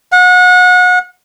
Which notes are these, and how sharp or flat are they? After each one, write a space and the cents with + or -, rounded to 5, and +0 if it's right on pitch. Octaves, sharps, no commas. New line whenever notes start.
F#5 -30